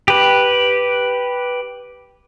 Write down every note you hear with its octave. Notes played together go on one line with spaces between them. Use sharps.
G4 B4